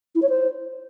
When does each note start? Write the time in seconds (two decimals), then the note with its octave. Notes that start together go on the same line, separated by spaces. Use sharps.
0.15 E4
0.22 C#5
0.29 C5